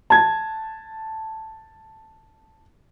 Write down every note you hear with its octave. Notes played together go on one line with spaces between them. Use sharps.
A5 G#6